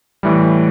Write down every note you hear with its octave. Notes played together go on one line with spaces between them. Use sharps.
A2 E3 G3